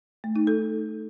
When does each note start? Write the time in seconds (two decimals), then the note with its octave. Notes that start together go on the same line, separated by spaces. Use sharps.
0.24 A3
0.36 D#4
0.47 A4